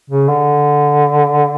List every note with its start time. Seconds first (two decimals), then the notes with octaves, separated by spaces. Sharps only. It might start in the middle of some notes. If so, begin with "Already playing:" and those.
0.10 C#3
0.29 D3